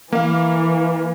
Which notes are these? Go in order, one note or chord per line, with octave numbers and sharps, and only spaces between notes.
E3 A#3 F5